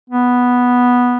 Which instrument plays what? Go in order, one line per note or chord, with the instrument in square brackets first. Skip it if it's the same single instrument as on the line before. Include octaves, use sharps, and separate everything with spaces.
[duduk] B3